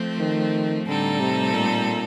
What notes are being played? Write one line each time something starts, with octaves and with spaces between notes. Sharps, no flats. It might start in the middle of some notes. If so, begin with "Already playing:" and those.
Already playing: F3 A3 C4
D#3
A2 D3 G3 C4 D#4 A4
C3
A#2